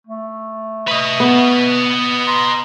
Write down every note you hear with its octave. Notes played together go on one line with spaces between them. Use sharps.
A3
B4 D#5
B3
A#5 C6